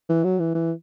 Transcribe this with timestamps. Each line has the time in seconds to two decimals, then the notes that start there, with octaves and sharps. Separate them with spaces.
0.09 E3
0.24 F#3
0.39 E3
0.55 E3